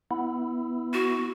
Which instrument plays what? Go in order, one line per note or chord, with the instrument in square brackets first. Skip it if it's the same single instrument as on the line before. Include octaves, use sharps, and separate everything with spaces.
[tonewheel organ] B3 E4
[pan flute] F#4